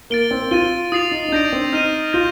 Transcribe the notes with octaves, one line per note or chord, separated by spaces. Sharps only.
A#3 A6 D7 G7
C4
F4 A6 D#7 G7
F4 D#6 A6 C7 F7
D#4
D#4
D4 G6 A#6 D7
C4
D#4 F6 A#6 D#7 G7
F4 G6 A#6 D#7 G7